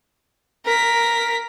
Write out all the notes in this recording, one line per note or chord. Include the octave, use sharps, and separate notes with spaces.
A#4 B6